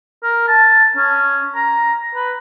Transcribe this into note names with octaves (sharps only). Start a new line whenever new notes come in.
A#4
A5
C#4
A#5
B4